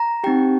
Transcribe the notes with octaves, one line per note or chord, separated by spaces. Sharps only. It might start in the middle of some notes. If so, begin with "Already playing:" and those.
Already playing: A#5
C4 D#4 G4 G5